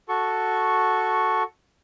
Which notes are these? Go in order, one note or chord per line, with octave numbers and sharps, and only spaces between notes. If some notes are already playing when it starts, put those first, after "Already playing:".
F#4 A4 C#6